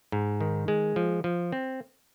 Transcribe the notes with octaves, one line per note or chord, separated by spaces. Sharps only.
G#2
D#3
G#3
F3
F3
C4